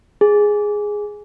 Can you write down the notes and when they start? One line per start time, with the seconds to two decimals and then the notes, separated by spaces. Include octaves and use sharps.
0.21 G#4